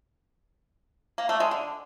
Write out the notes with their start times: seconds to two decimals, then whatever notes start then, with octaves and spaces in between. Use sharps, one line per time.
1.18 A#3
1.29 A3
1.40 G#3
1.51 D3